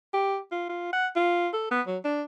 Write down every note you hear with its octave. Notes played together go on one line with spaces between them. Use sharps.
G4
F4
F4
F#5
F4
A4
B3
F#3
D4